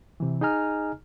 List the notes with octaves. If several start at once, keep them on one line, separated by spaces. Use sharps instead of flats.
C3 E3
D#4 G#4 D#5 G#5 A#5 F6